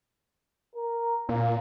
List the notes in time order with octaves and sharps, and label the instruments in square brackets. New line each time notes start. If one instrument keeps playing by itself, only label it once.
[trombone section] A#4
[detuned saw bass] A#2 [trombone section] A#3